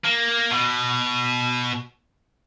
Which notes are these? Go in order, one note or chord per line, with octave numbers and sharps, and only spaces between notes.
A#3
B2